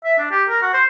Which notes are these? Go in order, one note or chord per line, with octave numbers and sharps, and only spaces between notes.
E5
D4
G4
A#4
F#4
C5